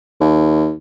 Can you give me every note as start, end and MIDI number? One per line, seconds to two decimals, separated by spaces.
0.21 0.73 39